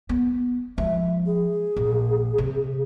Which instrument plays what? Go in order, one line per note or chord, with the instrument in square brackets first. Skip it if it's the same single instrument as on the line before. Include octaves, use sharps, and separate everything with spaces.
[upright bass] B3
[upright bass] F3 G#3 [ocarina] E5
[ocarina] G#4
[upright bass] A#1
C3